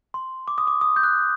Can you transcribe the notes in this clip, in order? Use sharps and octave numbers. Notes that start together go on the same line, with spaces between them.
C6
D6
D#6
D6
D#6
G6
F#6